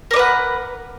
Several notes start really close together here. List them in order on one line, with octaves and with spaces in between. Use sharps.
A#4 D5 B4 F#5